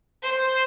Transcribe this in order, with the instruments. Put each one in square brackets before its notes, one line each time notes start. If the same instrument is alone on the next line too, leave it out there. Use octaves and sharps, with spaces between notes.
[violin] C5